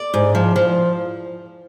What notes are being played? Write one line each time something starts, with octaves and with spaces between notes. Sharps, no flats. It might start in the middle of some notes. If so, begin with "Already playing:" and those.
Already playing: D5
G#2
F3
F3